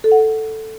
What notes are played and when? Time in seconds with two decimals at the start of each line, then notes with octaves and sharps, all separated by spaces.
0.04 A4
0.12 F#5
0.19 A4